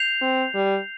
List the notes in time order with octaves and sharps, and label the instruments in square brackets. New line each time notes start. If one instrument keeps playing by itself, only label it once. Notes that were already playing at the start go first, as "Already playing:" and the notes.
Already playing: [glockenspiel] G6 C7 F7
[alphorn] C4
G3